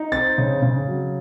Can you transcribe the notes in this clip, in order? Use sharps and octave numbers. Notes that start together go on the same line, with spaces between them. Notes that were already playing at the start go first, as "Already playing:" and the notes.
Already playing: D#4
C4 A6
C#3
C#3
F#3